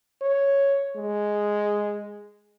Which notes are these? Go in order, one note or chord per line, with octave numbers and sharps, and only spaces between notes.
C#5
G#3